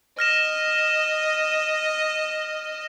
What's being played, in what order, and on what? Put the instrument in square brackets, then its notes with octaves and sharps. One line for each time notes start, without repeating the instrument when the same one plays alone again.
[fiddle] D#5 [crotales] F6 A#6 E7